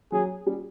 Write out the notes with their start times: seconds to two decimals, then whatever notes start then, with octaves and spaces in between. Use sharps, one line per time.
0.12 F#3 G#4
0.46 G3